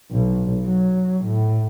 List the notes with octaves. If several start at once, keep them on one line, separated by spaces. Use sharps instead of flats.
B1
F#3
A2